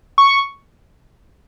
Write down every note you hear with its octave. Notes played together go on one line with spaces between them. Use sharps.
C#6